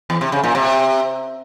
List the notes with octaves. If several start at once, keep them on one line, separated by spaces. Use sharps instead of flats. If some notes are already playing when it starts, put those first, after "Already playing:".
E2
C3
C#3
A#2
C3